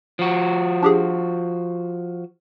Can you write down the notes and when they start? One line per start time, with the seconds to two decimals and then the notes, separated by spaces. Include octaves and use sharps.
0.19 F3 F#4
0.83 D4 G4 G#4